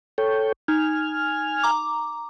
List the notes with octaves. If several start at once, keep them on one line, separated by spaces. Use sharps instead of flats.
A4 C#5 G5
D#4 G#5 F6
A#5 D6